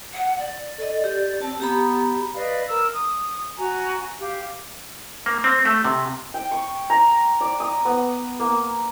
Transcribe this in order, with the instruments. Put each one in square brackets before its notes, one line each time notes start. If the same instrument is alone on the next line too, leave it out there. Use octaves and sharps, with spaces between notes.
[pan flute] F#5
D5
[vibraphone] A4 D#5
G4
[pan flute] C4 [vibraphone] A5
[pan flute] B3 [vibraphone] G4 A#5 B5
[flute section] B4 D5 D#5 F5
A#4 E6
D#6
F#4 G#5 A#5
G4 F5
[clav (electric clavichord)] A#3
C4
A3
C3
[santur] G5
C#6
A#5
D5
D#6
B3
A#3